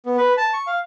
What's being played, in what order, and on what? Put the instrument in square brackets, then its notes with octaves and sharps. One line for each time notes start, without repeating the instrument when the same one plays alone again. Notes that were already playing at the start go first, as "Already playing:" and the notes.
[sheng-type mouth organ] B3
B4
A5
C#6
F5